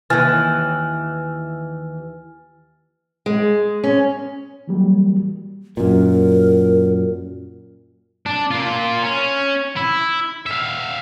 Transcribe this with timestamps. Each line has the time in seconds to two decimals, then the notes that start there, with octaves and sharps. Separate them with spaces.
0.10 D#2 E3 G#5 F6 A6
3.26 G#3
3.84 C#4
4.67 E3 F#3 G3 A#3
5.77 F#2 A#2 A#4
8.26 D4
8.51 A#3 F4
9.03 C#4
9.77 E4
10.46 E5 F5